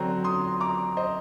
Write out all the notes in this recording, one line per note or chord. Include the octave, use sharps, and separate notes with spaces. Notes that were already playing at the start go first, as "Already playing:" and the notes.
Already playing: D3 F#3 C4 A#5
C6 D#6
A#5 D6
C5 D#5